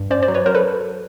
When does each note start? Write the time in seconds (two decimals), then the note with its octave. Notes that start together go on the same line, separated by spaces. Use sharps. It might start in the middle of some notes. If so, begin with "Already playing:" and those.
Already playing: G2
0.11 C#4 C5 D5
0.23 C5 D5
0.28 F#3
0.34 B4 C#5
0.46 F#3 A#4 C5
0.55 A4 B4